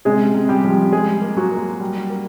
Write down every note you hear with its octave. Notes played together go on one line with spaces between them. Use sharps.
C3 G#3 G#4
C3
G3 G4
F3
G3 G#3 G#4
A#3
F#3 F#4
A#3
G3
A#3